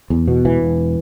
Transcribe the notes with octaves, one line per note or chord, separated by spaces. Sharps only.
E2
B2
E1 E3
E1